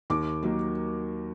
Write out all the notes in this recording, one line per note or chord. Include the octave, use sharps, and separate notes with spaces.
D#2 D6
D#3 F#3 A#3